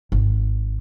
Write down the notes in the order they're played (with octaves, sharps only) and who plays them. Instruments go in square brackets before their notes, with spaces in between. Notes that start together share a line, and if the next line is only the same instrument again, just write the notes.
[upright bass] G#1